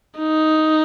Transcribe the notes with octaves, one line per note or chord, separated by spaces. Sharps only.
D#4